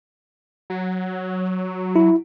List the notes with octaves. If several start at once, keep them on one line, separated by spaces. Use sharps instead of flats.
F#3
E4